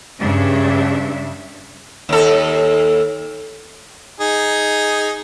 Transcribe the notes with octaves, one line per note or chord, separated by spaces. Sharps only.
G2 C#3 D4 E5
D#2 A4
D#4 G#4